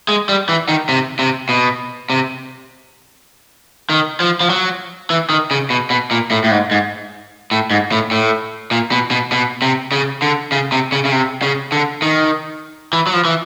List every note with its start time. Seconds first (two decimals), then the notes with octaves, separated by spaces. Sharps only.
0.09 G#3
0.29 G3
0.49 E3
0.68 D#3
0.89 C3
1.19 C3
1.49 B2
2.10 C3
3.90 D#3
4.20 F3
4.41 F3
4.50 F#3
5.10 E3
5.30 D#3
5.51 C#3
5.70 B2
5.90 B2
6.11 A#2
6.31 A2
6.44 A2
6.51 G#2
6.71 G#2
7.51 A2
7.71 G#2
7.92 A2
8.11 A2
8.71 A#2
8.91 B2
9.11 B2
9.32 B2
9.62 C3
9.92 C#3
10.22 D3
10.52 C#3
10.72 C3
10.92 C#3
11.05 C#3
11.12 C3
11.42 C#3
11.72 D3
12.02 D#3
12.93 E3
13.07 F#3
13.13 F3
13.25 E3